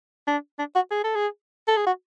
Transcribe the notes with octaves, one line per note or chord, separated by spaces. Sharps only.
D4
D4
F#4
G#4
A4
G#4
A4
G#4
F#4